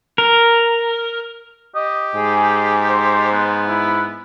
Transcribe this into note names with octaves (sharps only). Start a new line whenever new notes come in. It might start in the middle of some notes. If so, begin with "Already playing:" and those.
A#4
G4 D#5
G#2 G#4
C5
B3
E4